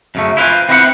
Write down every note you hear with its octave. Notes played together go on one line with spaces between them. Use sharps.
F#2 C#3 A3
E4 F4 B4 C5 G#5
C4 E4 B4 C5 D#5 F#5